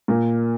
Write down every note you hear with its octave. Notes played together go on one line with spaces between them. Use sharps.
A#2 A#4